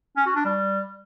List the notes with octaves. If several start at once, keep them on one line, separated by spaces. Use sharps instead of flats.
C#4
F#4
D4
G3